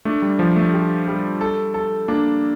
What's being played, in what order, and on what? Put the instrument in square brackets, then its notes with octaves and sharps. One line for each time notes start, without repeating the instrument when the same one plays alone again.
[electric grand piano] A3 [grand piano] D4
[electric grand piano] G3
[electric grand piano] F3 [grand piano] G4
[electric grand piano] A3
[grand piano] G4
G3
A4
A4
[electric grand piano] A#3 [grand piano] D4